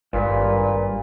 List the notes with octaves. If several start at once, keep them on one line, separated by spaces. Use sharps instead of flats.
G#1 G2 A#2 B4